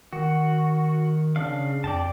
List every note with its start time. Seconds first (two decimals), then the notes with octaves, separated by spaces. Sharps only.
0.13 D#3 F#4
1.36 C#3 D4 F5
1.84 F2 D5 G5 A5